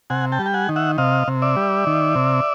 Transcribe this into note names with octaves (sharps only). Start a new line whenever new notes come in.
C3 F#5 G#5
G5 A5
G3
G5
F#5 G#5
D#3
E5 F#5
C3 D#5 F5
C3
D5 E5
G3
D#3
C3